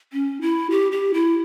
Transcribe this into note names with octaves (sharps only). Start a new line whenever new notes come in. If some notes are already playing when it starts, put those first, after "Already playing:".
C#4
E4
G4
G4
E4